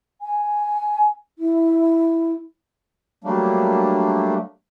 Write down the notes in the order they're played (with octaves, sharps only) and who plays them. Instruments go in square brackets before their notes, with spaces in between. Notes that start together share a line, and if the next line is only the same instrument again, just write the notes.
[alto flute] G#5
E4
[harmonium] F#3 G3 A3 A#3 D4